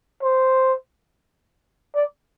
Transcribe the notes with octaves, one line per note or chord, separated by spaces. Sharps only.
C5
D5